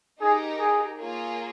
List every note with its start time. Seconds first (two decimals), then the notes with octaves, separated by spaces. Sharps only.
0.21 D#4 G4 G#4 A#4
0.59 G#4
0.97 A#3 F4 G#4 C#5